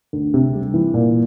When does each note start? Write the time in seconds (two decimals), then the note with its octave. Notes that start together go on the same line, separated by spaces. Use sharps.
0.13 D2
0.34 C3
0.54 G3
0.74 E3
0.94 A#2